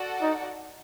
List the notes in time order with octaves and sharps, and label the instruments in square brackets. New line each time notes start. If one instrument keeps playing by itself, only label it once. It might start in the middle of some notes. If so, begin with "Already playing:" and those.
Already playing: [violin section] F#4 A4 D5 F#5
[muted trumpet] D#4